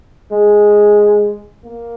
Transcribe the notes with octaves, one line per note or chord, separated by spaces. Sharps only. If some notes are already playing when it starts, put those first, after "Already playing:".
G#3
A#3